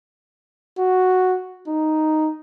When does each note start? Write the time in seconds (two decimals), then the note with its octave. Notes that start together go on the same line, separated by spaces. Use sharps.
0.79 F#4
1.68 D#4